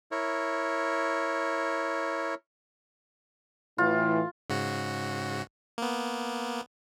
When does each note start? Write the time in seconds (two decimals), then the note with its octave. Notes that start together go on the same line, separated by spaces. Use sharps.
0.12 E4 A#4 C#5
3.78 A2 E3 F4
4.50 G#2 C#3 F#4
5.78 A#3 B3